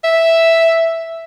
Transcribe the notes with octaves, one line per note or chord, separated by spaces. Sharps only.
E5